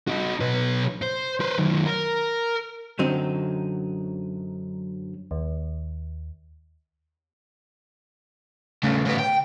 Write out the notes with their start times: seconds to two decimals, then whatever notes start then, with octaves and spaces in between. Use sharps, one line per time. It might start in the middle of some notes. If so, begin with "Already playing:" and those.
0.08 D#4 F#4
0.41 B1 B4
1.02 C5
1.40 B4 C5
1.59 F#2 D#3
1.86 A#4
2.99 F#2 D3 F#3 C4 D#4
5.31 D#2
8.83 C#3 A3
9.06 C#3 B3
9.19 G5